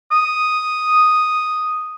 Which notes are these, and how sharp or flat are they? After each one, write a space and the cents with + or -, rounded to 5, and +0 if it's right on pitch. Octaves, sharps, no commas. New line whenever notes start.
D#6 +0